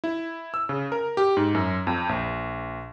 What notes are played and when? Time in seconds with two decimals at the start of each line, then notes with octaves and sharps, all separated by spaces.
0.04 E4
0.54 E6
0.69 C#3
0.92 A#4
1.17 G4
1.37 G#2
1.55 F#2
1.87 F2
2.09 A#1